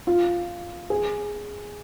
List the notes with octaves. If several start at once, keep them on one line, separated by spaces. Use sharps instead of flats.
F4
G#4